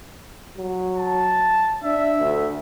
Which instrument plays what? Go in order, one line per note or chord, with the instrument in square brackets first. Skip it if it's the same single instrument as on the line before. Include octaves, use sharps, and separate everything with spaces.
[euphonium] F#3
[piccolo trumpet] A5
[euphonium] D4 [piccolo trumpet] E5
[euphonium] D2